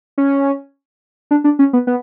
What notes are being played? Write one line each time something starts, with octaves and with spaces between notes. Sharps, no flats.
C#4
D4
D4
C#4
B3
B3